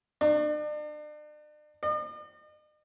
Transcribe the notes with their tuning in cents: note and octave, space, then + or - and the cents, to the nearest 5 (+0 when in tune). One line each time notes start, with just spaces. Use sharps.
D4 +40
D#5 -45